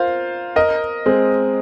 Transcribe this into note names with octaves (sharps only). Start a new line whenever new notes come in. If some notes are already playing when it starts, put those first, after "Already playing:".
Already playing: F4 A#4 C5 F5
A#4 D#5
G#3 C4